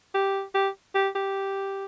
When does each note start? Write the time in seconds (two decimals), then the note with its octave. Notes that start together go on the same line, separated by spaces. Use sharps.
0.14 G4
0.54 G4
0.95 G4
1.15 G4